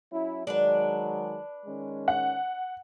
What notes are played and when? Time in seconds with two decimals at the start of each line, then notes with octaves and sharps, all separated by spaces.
0.12 F#3 C#4 E4
0.47 D#3 F#3 G#3 D4 B4
1.66 D#3 G#3 C#4
2.08 F#5